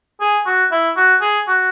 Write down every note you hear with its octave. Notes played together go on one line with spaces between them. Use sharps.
G#4
F#4
E4
F#4
G#4
F#4